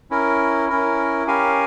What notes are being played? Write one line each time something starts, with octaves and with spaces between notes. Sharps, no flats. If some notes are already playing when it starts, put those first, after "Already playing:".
C#4 E4 A#4
C#4 E4 A#4
C#4 G4 A#4 F5 G#5